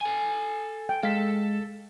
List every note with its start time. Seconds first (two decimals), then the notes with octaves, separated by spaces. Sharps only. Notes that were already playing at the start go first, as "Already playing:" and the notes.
0.01 A4 G#5
0.89 G5
1.03 G#3 A4 F5 B6